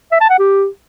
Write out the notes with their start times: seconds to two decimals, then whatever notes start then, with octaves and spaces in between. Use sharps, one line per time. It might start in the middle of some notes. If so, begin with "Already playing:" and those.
0.12 E5
0.21 A5
0.30 F#5
0.39 G4